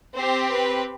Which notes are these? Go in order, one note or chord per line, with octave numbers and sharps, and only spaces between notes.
C4 G4 C5
B4